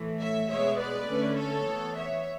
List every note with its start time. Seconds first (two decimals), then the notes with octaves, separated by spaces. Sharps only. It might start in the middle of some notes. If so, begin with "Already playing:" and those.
Already playing: A2 E3 A3
0.20 C#5 E5
0.49 B2 G#3 B3 C#5 E5
0.78 B4 D5
1.08 D3 A3 C#4
1.37 A4 C#5
1.66 E3 B3
1.95 C#5 E5